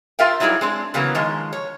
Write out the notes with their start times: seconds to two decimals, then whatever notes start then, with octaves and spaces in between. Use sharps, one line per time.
0.19 F4 A#4 E5 F5 G5
0.40 F#3 G3 D#4 E4 G#4
0.61 G#3 C4 D4
0.94 C#3 E3 F#3 A#3 B3
1.15 D#3 F3 G#3
1.53 C#5